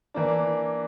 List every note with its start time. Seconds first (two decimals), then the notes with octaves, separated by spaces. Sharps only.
0.14 E3 A#3 D4